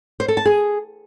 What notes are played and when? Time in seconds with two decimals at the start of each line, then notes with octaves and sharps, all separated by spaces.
0.20 C5
0.28 A4
0.37 A5
0.46 G#4